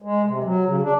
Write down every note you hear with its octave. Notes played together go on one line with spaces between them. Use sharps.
G#3
C3
F#3
C#3
D4